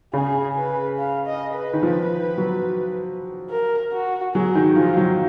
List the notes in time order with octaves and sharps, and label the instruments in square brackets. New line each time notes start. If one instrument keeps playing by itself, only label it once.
[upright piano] C#3 [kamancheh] G#4
[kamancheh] B4
F5
D#5
B4
[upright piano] D#3
F3
F#3
[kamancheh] A#4
F#4
[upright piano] F#3 [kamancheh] G#4
[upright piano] D#3
[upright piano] F3 [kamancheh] F4
[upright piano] F#3